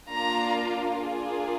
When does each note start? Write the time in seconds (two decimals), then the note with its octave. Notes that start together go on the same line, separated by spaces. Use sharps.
0.10 A#3 D4 F4 A#5
0.97 A#3 D4 F4 G#4